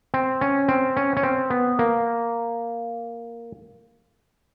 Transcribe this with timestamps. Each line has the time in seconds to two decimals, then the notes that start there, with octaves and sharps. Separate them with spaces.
0.14 C4
0.41 C#4
0.68 C4
0.97 C#4
1.17 C#4
1.23 C4
1.50 B3
1.79 A#3